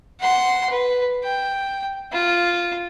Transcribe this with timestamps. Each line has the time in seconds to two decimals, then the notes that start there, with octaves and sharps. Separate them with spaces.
0.20 F#5 C6
0.70 B4
1.24 G5
2.13 F4